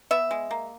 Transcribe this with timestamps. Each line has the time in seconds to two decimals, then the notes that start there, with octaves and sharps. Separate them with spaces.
0.11 B3 E5
0.31 G#3
0.51 A#3